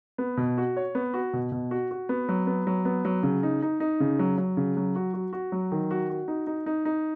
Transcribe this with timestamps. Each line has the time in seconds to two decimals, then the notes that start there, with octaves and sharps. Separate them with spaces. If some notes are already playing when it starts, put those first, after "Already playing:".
0.18 B3
0.37 B2
0.58 F#4
0.77 C#5
0.95 B3
1.14 F#4
1.33 B2
1.52 B2
1.71 F#4
1.91 F#4
2.09 B3
2.29 F#3
2.47 B3
2.67 F#3
2.85 B3
3.05 F#3
3.23 C#3
3.43 D#4
3.62 D#4
3.80 D#4
4.00 C#3
4.19 F#3
4.38 F#3
4.57 C#3
4.77 F#3
4.96 F#4
5.14 F#4
5.33 F#4
5.52 F#3
5.72 D#3
5.91 F#4
6.10 F#4
6.28 D#4
6.47 D#4
6.66 D#4
6.85 D#4